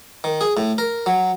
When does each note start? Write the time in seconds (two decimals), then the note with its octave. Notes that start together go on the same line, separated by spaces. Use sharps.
0.24 D#3
0.41 G#4
0.57 A2
0.78 A#4
1.06 F#3